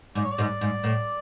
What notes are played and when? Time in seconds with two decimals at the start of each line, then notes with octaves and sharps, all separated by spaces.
0.15 G#2 D5
0.24 C#5
0.31 D5
0.38 G#2
0.61 G#2
0.83 A2